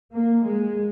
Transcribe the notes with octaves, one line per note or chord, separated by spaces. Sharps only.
A#3
G#3